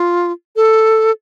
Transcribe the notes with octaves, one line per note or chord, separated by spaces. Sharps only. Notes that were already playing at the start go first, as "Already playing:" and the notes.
Already playing: F4
A4